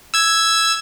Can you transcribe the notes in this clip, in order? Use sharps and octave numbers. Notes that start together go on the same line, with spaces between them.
E6 G#6